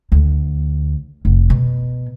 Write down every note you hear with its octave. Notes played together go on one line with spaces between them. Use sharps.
D2
F1
B2